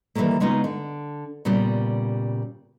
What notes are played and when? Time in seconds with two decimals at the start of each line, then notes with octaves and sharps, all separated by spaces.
0.15 D#3 E3 F#3 G3 A3 A#3
0.40 C#3 G#3 B3 D#4 F4
0.64 D3
1.45 A#2 C#3 G3 B3 F4